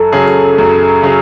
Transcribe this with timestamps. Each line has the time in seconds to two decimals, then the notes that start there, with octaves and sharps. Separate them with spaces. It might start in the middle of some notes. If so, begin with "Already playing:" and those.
Already playing: F#2 A4
0.12 C#3 F#3 C#4 G#4
0.58 F#2
1.02 C#3 F#3 C#4 G#4